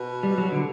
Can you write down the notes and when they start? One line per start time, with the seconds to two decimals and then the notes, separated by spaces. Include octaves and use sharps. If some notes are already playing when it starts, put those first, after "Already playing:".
Already playing: B2
0.23 G3
0.38 F#3
0.52 D3